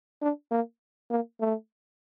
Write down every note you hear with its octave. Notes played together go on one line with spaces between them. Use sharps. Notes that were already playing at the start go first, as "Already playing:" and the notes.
D4
A#3
A#3
A3